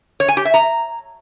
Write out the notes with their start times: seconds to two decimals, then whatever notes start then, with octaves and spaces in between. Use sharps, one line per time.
0.20 C#5
0.28 G#5
0.37 G4
0.45 E5
0.54 A#5